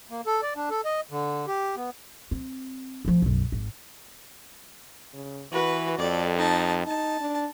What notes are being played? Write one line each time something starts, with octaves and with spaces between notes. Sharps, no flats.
A#3
A4
D5
D4
A4
D#5
D3
G4
B3
C4
D2 F3
B1 F#2
G#1
C#3
E3 F#4 B4
F2 A4 D5
D#4 A5
D#4 A5
D4